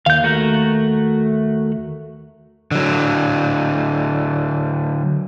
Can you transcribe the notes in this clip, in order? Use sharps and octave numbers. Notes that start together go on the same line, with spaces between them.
D#2 F5 G6
A3 F#4 A#4
D3 F#3